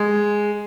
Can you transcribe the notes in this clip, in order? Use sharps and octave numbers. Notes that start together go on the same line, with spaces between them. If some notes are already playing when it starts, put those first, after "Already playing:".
Already playing: G#3